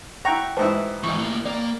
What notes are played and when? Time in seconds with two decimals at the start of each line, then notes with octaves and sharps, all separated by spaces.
0.25 E4 F#5 G5 A#5 C#6
0.57 A1 G#2 E4 B4 C5 A5
1.03 A1 G#2 E3 C#6
1.19 A2 A#3
1.46 A#3 D5